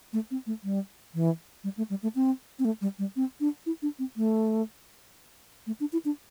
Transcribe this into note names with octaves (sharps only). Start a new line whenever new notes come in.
A3
C4
A3
G3
E3
G3
A3
G3
A3
C4
C4
A3
G3
G3
C4
D4
E4
D4
C4
A3
A3
D4
E4
D4